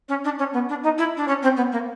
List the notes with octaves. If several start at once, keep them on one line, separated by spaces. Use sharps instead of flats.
C#4
D4
C#4
B3
D4
D#4
E4
D4
C#4
C4
B3
A#3